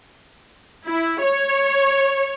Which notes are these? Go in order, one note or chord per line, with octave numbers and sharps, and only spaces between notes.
E4
C#5